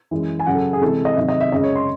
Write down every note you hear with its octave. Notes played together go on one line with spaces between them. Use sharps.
F#2 E3 G#3
G#5
F#2 C#3 F#3 F#5
A4
G#4
C3 E3 G#3 A4
D#5
C3 D#3 F#3 E5
D#5
E5
F#2 C#3 G#3 D#5
C#5
C6